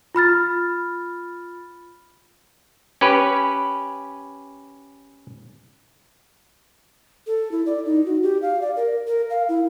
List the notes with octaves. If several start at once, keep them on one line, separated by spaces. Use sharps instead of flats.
F4 B5 F6 A6
C#4 G4 B4
A4
E4
D5
D#4
F#4
G4
F5
D5
A#4
A#4
F5
E4